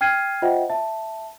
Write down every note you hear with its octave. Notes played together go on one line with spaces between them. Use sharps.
G5 F6 G#6 C7 D#7
F4 C5 D#5 E5 F#5 G5
E5 A5